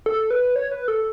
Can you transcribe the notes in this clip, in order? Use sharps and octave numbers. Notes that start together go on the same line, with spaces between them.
A4
B4
C#5
B4
A4